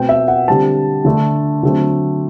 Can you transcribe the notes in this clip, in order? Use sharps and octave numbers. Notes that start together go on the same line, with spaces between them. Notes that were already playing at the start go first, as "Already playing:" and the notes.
Already playing: B2 A3 C4 G5
E5
F#5
D3 G3 C4 A5
D3 A3 D4
D3 F#3 A3 C4